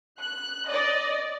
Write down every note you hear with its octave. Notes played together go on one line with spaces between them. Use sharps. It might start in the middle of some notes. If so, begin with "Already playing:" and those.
F#6
D5 D#5